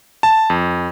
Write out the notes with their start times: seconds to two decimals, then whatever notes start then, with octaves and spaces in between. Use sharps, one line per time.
0.23 A5
0.50 F2